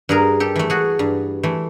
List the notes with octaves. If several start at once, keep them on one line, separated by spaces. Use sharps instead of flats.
G2 G#4 A#4
G4 A4
E3 A3
F#4 G#4
G2
E3 A3